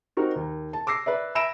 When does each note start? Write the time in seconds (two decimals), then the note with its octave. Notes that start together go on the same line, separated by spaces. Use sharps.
0.17 C4 D#4 F#4 A#4
0.36 D#2
0.73 A5
0.87 D6 E6 A#6 C7
1.06 B4 D5 E5
1.35 E5 B5 E6 A#6 D7 E7